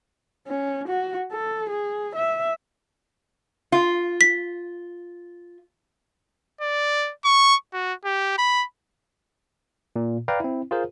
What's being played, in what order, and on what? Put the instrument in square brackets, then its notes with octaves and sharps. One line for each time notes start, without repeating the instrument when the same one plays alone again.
[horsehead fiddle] C#4
F#4
A4
G#4
E5
[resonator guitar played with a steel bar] F4
[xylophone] B6
[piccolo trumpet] D5
C#6
F#4
G4
B5
[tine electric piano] A#2
B4 D5 F5 G5 A#5
C4 E4
F4 G#4 A#4 C5